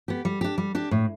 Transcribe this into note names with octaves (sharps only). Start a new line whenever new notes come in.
B3 G4
G3
D4 G4
G3
D4 G4
A2